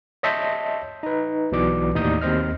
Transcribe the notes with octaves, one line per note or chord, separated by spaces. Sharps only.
C#5 D#5 E5 A5 C6 G6
D#4 B4
B1 B2 E3 D5 D6
D#2 A2 D#4 D5 D#6 G6
D#2 C4 C5 D#5 F6